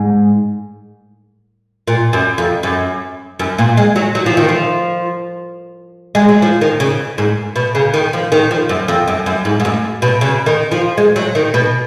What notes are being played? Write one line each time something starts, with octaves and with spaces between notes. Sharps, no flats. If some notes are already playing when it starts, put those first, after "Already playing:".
Already playing: G#2
A#2
F#2
F2
F#2
F#2
A#2
G#3
F#3
F#3
F3
D#3
F3
G#3
F#3
F3
D#3
C#3
G#2
B2
C#3
D#3
F3
D#3
F3
F#2
F2
F#2
F#2
G#2
G#2
F#2
B2
C#3
D#3
F3
G#3
F#3
D#3
B2